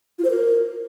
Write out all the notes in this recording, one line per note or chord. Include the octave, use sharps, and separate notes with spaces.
F4
C5
A#4